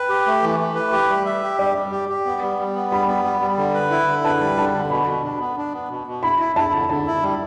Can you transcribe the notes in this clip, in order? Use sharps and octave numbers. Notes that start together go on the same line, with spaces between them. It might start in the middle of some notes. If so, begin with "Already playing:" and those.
Already playing: B4 G5
G4
A3
E3
A3
B4
G4
G3
E5
G4
G3 D5
G3
G4
G4
B3
G3
G3
B3
G3 B5
B3
G3
G3
D3
B4
E4
D3
B4 A5
G3
D3 A5
D3
B2 B5
B2
D4
B3
D4
B3
B2
B2
E4 B5
E4
E4 A5
D3
D3 A5
E4
G3